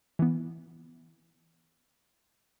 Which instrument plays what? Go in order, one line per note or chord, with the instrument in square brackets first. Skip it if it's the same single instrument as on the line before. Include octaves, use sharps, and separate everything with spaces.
[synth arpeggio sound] E3 B3